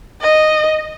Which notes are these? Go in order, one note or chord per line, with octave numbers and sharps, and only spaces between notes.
D#5